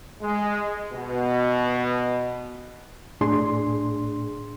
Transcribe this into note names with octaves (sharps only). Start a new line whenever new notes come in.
G#3
B2
A2 D4 G#4 C6